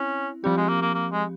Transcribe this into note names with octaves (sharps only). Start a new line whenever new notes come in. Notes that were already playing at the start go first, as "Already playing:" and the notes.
Already playing: C4 C#4 E4
F3 G3 C4 G4
G#3
A#3
A#3
A#3
G#3